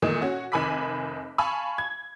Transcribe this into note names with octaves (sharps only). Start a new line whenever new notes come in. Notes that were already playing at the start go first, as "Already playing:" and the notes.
A#2 D#3 E3 G#3 A3
C#4 F#4 C#5
F1 D#3 G#5 B5 D6 B6
F5 G#5 A5 B5 C#6
G#6